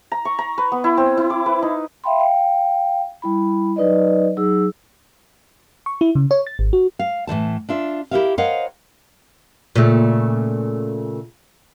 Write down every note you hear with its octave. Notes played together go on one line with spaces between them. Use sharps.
A#5
C#6
A#5
B4
B3
E4
C4
E4
D6
B4
D#4
E5 F5 G5 B5 C6
F5 G5
G3 E4 B5
F#3 D#4 B4 D5 D#5
F#3 D#4 G#4 E6
C#6
E4
C#3
C#5
A6
G#1
F#4
F5
A2 E3 F3 A5
D4 F4 E5
E4 G4 G#4 A#4 E5 F5
A#4 C5 C#5 D#5 F5 F#5
A#2 C#3 A3